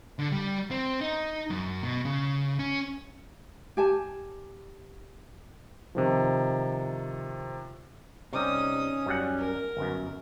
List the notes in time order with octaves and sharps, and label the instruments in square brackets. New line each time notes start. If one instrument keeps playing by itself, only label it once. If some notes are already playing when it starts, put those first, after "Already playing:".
[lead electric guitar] D3
G3
C4
D#4
F#2
B2
C#3
C#4
[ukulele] G4 G#5 A5
[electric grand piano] C3 D#3 F3
[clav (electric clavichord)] C3 G3 [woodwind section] C#4 [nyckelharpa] D#4 D#6
[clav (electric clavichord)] F#2 G3 F#5
[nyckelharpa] A#4
[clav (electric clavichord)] G1 F#2